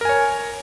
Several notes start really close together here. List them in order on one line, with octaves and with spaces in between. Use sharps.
A#4 G#5 C#5